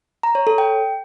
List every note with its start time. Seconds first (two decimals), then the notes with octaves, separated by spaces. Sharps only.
0.23 A#5
0.35 C#5
0.47 A4
0.58 G5